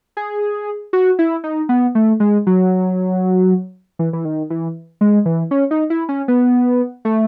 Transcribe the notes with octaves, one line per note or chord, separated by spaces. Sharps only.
G#4
F#4
E4
D#4
B3
A3
G#3
F#3
E3
E3
D#3
E3
G#3
E3
C#4
D#4
E4
C#4
B3
A3